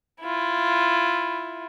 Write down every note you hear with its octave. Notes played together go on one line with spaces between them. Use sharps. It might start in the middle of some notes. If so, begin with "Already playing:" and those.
E4 F4